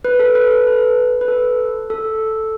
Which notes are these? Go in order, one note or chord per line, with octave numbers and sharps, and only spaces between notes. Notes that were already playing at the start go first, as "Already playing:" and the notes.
B4
A4
B4
A4
B4
B4
A4
A4